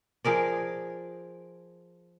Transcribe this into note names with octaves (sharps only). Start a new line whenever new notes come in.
F3 G#4 A#4 D5